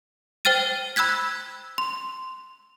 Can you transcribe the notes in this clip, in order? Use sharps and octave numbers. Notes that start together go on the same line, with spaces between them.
C5 G5 F6 A6 D#7
B5 E6 F#6 G#6 B6
C6